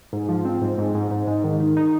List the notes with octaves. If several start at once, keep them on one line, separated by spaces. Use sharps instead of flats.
G#2
F3
C4
G#2
G#2
G#2
G#2
G#2
D#3
D#3
D#4